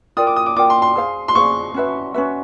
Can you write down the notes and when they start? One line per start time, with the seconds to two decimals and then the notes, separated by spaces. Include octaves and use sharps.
0.17 F4 A#4 D5 G5 D#6
0.27 D6
0.36 D#6
0.46 D6
0.56 F4 A#4 D5 G5 D6
0.70 C6
0.82 C6
0.96 G#4 C5 F5
1.28 C6
1.35 G#4 C5 F5 C#6
1.74 C#4 F#4 B4 E5
2.14 C#4 F#4 B4 E5